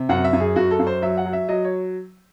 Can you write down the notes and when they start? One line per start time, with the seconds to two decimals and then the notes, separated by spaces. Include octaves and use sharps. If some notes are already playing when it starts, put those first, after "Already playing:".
Already playing: C3
0.09 F#2 F#5
0.24 E5
0.33 F#2
0.40 G#4
0.56 F#2 F#4
0.71 A4
0.79 F#2
0.87 C5
1.02 F#3 E5
1.17 F#5
1.25 F#3
1.33 E5
1.49 F#3 D#5
1.64 C#5